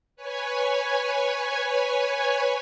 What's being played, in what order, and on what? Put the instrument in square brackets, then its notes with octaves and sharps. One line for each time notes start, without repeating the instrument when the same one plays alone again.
[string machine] B4 C#5 G#5